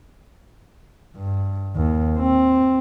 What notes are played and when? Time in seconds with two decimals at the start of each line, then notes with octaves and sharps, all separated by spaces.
1.16 G2
1.76 D#2
2.19 C4